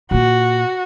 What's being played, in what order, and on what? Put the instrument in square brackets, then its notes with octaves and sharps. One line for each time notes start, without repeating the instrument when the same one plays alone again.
[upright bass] A#2 A#3 [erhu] F#4